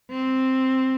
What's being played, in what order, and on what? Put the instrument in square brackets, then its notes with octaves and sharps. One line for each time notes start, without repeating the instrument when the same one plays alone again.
[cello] C4